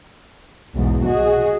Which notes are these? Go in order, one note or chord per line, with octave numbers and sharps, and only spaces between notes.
B1 E2 G#2
F#4 G#4 D#5